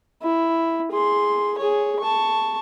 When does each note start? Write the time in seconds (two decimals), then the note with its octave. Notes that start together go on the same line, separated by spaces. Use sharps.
0.23 E4
0.92 G#4 C6
1.59 G#4 C#5
2.00 A5 C#6